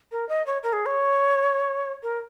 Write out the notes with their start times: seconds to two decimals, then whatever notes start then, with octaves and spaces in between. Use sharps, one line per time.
0.12 A#4
0.29 D#5
0.46 C#5
0.63 A#4
0.73 G#4
0.86 C#5
2.03 A#4